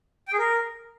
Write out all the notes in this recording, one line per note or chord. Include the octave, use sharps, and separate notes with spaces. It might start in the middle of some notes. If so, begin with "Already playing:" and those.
G5
G#4
A#4